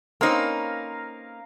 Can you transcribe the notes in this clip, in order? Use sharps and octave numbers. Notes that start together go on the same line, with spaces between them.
A#3 C4 C#4 D#4 A#4 B4 F5